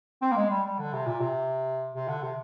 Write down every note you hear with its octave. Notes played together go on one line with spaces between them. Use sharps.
C4
A#3
G#3
G3
G3
D3
C3
A#2
C3
C3
D3
C3